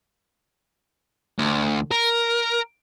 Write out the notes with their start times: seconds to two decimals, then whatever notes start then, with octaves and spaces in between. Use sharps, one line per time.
1.39 D2
1.92 A#4